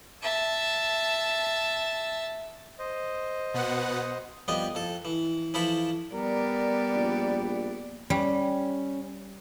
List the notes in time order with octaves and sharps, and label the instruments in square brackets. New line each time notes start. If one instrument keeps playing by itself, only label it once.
[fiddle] E5 A5
[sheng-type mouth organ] C5 D#5
[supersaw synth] B2 B3 F#5
[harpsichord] F2 G3 B3 D#5
F2 A4
E3
E3 F3 E4 A4 B5
[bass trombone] G3 [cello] B3 D5 [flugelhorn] A#4
[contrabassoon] A#1
[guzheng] G3 [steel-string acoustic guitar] C#4